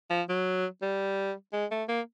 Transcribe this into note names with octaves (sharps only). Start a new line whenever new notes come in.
F3
F#3
G3
G#3
A3
A#3